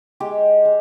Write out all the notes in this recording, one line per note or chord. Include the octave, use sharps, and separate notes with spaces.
G#3 G4
G#3